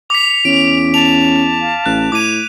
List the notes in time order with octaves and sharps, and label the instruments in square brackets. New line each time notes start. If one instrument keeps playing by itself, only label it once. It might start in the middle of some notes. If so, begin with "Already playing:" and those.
[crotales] D6 B6 [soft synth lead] C#7 [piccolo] F7
[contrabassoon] E2 [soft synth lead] C#4 [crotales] D7
[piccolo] A5 [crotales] F7
[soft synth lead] F5
[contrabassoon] A1 [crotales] F#6
[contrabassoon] A2 [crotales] D6 D#7 [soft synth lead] G#6